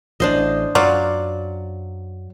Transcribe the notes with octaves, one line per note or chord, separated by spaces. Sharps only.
A1 D4 C5 D#5
F#2 F#3 F4 D5